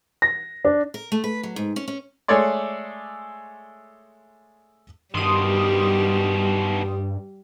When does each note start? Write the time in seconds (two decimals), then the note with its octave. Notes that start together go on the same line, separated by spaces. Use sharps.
0.22 A#6
0.65 D4
0.94 A#4
1.12 A3
1.24 B4
1.43 F#3
1.56 G#2
1.76 C#4
1.88 C#4
2.28 G#3 A3 A4 C#5 D5 C6
5.14 G2 B2 D#3 G3 C6 D#6